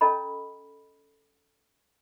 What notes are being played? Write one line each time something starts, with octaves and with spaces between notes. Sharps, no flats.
C#4 A4 D#5 A#5 B5